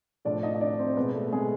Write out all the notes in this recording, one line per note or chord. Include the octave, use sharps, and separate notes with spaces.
A2 F3 A3 D4 D5
D#4 D#5
D#5
D4 D5
C4 C5
B2 G#3 B3 B4
A3 A4
G#3 G#4